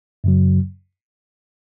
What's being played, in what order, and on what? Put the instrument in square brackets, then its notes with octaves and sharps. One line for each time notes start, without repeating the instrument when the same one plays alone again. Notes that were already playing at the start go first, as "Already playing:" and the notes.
[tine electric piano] F#2 C#3 F#3